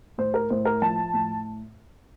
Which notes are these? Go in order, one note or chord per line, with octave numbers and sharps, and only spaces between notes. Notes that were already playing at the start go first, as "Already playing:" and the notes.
A2 C5
A#4
A2 C5
A#4
F3 A5
A2